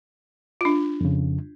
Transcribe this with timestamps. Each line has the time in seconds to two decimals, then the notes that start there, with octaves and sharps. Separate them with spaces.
0.61 D4 F4
1.01 F2 C#3